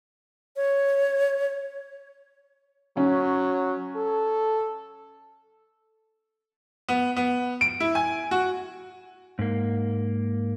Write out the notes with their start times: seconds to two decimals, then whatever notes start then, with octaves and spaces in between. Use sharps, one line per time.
0.56 C#5
2.97 F#3 C#4
3.96 A4
6.89 B3
7.16 B3
7.61 D7
7.80 E4
7.95 G#5
8.31 F#4
9.39 G#2 A#3